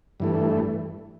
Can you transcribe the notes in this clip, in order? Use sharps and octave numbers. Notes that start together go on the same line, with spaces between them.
G2 E3 A3